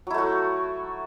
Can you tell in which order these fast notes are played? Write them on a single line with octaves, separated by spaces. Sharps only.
F#3 E4 A3 F#4